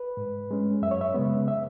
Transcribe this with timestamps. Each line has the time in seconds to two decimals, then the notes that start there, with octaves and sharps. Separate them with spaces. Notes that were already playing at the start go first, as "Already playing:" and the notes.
Already playing: B4
0.17 G#2
0.51 G#3 C#4
0.82 F#2 E5
0.91 C#5
1.01 E5
1.14 C#3 G#3 B3
1.48 E5